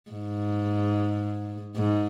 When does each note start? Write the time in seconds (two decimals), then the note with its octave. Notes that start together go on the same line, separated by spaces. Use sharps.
0.11 G#2
1.76 G#2